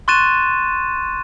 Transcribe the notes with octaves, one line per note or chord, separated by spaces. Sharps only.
C6 C#6 F#6 A6 D#7 E7